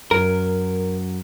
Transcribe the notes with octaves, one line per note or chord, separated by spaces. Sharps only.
F#2 A#4